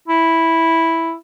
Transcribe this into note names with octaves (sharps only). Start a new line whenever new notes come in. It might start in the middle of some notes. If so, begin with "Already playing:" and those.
E4